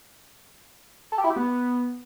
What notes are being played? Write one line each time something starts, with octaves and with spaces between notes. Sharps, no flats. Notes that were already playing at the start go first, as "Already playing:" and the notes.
A4
G4
E4
G4
B3